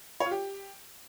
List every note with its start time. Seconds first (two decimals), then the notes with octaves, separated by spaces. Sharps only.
0.20 C#5
0.26 F4
0.31 G4